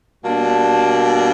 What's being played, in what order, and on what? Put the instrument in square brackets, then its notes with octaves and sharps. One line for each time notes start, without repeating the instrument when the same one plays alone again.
[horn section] B2 G3 A#3 D4 A5